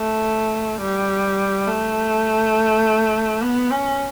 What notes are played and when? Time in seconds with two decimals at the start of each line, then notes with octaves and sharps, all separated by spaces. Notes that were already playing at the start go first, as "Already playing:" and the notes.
Already playing: A3
0.80 G3
1.66 A3
3.41 B3
3.70 C#4